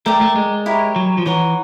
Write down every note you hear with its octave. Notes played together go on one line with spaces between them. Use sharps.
A3 A#4 D5 G5
A3
G#3
E4 G4 A#4 C#5
F#3
F3
E3 C#5 F#5 A#5